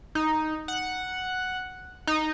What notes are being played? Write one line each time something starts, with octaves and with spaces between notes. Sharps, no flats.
D#4
F#5
D#4